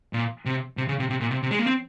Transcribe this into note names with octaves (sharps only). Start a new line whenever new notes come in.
A#2
C3
C3
C#3
C3
C3
A#2
C3
C3
G#3
A#3
C4